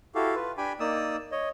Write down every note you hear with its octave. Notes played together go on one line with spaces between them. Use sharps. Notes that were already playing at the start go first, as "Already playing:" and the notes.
E4 F#4 G4 A4 F5
F4 B4
D4 G4 G5 G#5 B5
A#3 D#4 D5 D#6 E6
C#5 D#5